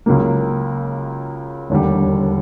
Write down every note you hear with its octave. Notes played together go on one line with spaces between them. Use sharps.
C#2 C#3 F#3 A#3
E1 D#2 D3 G3